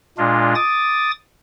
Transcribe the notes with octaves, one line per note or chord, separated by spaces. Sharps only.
A#2 G#3 D4 F4
D6 D#6 A6